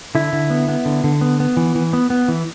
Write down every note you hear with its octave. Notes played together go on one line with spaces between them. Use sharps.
D3 E4
D3
B3
B3
D3
D3
B3
B3
E3
E3
B3
B3
E3